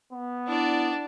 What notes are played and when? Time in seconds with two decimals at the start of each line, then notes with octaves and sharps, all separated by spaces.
0.13 B3
0.47 D4 E4 D5